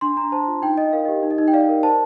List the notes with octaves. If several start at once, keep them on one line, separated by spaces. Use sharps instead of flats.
D4 C6
D4 A#5
C5 A5
F4
D#4 G5
D#4 D#5
A#4 F5
G4 D#5
D#4
D#5
D#4
G5
D5 F5
A#4
C5 A5